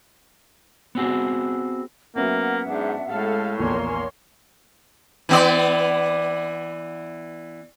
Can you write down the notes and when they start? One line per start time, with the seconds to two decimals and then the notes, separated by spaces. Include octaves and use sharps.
0.95 B3 C4 F#4 G#4
2.16 F#3 A#3 B3 C#4 E5 F#5
2.69 G#2 D4
3.10 A2 G#3 A4 F5
3.59 A#1 E2 A#3 A#4 C#5 G#5 C6
5.29 E3 B3 D5